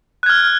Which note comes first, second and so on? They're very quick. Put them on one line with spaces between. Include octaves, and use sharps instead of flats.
F#6 G#6 F6